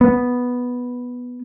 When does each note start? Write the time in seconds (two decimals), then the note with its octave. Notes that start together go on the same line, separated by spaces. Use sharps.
0.01 B3